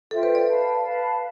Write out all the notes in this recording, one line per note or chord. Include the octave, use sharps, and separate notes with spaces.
F4 A4 C5 E5 G5
B4
D5
B4 F5 A5
B4 F5 A5